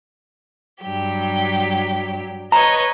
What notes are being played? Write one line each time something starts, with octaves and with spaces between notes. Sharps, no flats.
G2 F#3 G4
B4 C#5 D#5 A#5